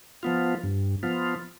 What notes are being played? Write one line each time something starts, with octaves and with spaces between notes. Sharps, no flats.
F3 B3 F4
G2
F3 B3 F4